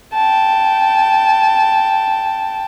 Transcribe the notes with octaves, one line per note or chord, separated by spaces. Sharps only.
G5 A5